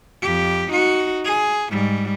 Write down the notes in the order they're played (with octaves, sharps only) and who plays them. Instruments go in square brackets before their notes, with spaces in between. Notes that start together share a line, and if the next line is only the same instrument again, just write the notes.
[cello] F2 G4
D#4 F#4
G#4
G#2 G3